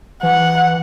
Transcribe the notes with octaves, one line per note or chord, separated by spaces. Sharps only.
E3 F#5